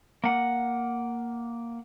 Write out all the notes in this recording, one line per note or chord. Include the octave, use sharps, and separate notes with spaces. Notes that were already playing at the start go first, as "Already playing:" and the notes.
A#3 F#5